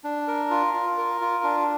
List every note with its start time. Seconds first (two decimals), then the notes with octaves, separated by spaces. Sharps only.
0.04 D4
0.28 A#4
0.51 F4
0.74 F4
0.98 A#4
1.21 F4
1.44 D4